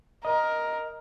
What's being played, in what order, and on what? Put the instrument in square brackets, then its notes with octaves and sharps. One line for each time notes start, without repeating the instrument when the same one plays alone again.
[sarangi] A#4 [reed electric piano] D#5